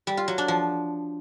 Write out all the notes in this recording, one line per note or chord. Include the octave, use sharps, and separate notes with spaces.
G3
F4
F#3
D4
F3